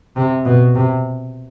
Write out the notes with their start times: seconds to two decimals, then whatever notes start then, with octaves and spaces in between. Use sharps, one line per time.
0.16 C3
0.45 B2
0.76 C3